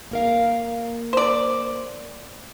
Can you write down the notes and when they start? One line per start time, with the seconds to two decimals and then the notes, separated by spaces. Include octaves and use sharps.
0.11 A#3 A#4 F5
1.13 C5 D5